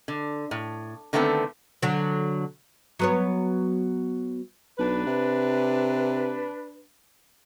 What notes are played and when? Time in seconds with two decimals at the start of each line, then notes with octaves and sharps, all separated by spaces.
0.08 D3
0.51 A2
1.13 D3 D#3 A3 B3 C4 A4
1.83 D3 F#3
2.99 F#3 B3 C#5
4.79 B1 D4 B4
5.06 C3